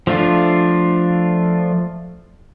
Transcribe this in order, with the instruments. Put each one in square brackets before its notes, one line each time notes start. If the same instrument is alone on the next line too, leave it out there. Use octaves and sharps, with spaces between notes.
[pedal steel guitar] F3 A3 D4 F4